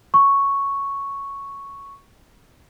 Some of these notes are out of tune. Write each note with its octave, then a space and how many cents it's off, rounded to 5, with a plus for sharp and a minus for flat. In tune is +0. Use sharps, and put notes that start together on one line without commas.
C#6 +0